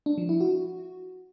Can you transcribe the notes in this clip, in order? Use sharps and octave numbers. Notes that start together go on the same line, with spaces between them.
D4
F3
E4
F#4